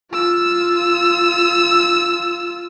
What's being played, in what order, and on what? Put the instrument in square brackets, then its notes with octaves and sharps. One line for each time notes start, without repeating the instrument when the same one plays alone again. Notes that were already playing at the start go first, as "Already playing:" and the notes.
[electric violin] F4 E6